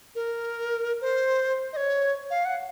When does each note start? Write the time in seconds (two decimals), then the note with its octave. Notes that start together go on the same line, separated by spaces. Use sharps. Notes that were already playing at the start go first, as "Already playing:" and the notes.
0.15 A#4
1.01 C5
1.73 D#5
1.77 C#5
2.30 F5
2.45 F#5